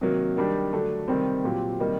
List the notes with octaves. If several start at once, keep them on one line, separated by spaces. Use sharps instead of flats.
C3 D#3 F#3 A#3
D#3 G3 D4 G4
D3 F#3 A3 D4
C3 D#3 G3 C4
A#2 F#3 C4 G4
C3 D#3 G3 A#3 D#4